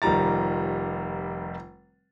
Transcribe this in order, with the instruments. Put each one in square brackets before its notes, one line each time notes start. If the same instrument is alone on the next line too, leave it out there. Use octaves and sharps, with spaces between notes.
[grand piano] F1 D#3 F3 G3 A#5 A6